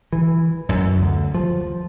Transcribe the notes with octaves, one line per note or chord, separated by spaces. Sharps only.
E3
F#2
D2
F3